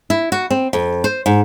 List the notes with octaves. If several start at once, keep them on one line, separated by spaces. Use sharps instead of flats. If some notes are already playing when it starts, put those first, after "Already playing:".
E4
F#4
C4
F2
C5
G#2